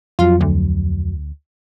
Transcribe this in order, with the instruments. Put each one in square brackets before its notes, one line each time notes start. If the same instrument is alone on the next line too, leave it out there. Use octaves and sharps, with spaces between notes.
[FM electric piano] F2 F#3 [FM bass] F4
[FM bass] D2